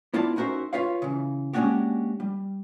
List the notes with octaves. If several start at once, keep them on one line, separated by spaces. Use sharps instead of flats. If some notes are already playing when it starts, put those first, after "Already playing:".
B3 E4 F4 D5 A5
C#4 D#4 F#4 A#4 C5 E5
F4 B4 C#5 F5
C#3 E3
G#3 A#3 C#4 D4 F#4 G4
G3